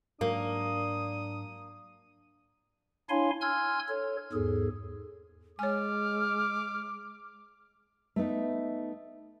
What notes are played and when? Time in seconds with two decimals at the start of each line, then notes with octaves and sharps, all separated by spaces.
0.21 G#2 F#3 A#3 D4 D#6
3.09 D4 E4 C#5 F5 G#5 C6
3.41 G#5 C6 E6 F6 G#6
3.88 A4 C#5
4.33 E2 G#2 G#4 A4
5.59 G#3 C#5 G#5 D6 F6
8.16 A3 B3 D#4